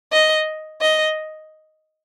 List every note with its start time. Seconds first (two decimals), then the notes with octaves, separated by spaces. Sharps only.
0.12 D#5
0.81 D#5